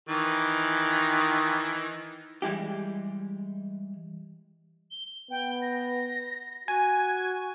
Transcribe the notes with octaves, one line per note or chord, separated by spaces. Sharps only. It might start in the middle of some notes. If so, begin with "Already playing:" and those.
D#3 E3
E3 G3 G#3 E4 G4
G7
B3 G5
A#6
F#4 G#5